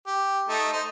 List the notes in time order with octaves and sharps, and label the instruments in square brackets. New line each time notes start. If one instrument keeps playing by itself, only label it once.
[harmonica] G4
A3 D#4
D#4 C5